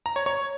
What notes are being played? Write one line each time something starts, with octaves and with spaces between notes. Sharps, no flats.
A#5
C#5
C#5